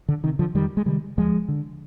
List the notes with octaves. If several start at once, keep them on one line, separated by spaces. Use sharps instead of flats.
D3
C3 D#3
D3 F3
F2 D#3 G3
G#3
C3 D#3 G3
D#2 F3 G#3
D3